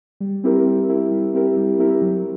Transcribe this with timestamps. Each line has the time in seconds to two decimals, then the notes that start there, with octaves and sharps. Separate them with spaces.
0.20 G3
0.44 C4 E4 G4 A#4
0.66 G3
0.89 C4 E4 G4 A#4
1.11 G3
1.34 C4 E4 G4 A#4
1.57 G3
1.79 C4 E4 G4 A#4
2.02 F#3